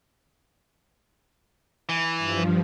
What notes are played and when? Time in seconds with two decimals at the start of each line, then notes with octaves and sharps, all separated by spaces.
1.89 E3
2.18 G2 F3